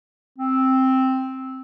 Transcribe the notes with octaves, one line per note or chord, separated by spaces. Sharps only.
C4